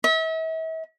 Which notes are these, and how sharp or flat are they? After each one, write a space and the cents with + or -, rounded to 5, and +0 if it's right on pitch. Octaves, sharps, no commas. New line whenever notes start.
E5 -40